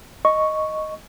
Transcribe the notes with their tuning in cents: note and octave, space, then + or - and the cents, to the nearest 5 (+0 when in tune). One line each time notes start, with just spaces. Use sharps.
D#5 +0 C#6 +0